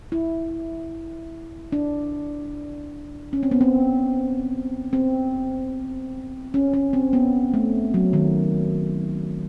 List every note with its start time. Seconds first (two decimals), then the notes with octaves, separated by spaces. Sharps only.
0.12 E4
1.72 D4
3.33 C#4
3.43 C4
3.51 B3
3.61 C4
4.93 C4
6.54 C#4
6.73 C#4
6.93 C4
7.13 B3
7.54 A3
7.94 F#3
8.13 D#3